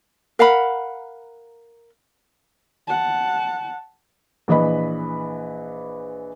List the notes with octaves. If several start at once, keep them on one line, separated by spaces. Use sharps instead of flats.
A#4 F5 F#5 B5
F#5 A5
A#1 E3 B4 D#5 B5